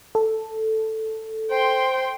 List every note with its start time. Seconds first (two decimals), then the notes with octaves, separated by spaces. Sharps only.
0.15 A4
1.50 C5 G5 C6